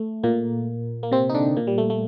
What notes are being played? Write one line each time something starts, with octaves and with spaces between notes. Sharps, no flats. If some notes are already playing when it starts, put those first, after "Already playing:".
Already playing: A3
A#2 A#3
A#3
C3 C4
D#4
D3 D4
A#2 A#3
G3
A3
A3